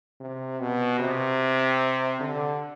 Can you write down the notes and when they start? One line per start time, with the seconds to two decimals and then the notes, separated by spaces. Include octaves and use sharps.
0.20 C3
0.60 B2
0.99 C3
2.20 D3